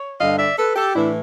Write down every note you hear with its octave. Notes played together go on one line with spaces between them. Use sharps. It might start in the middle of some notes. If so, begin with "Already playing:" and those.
Already playing: C#5
G2 D3 D#5 F5
D5 E5
A4 B4
G4 A4
A2 E3 D4 E4